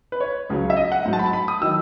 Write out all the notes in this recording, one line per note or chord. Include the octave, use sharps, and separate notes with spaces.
B4
C#5
C#2 C#3 F#3
E5
D#5
F#5
G#2 F#3
A5
B5
A5
B5
D#6
D#3 F#3 E6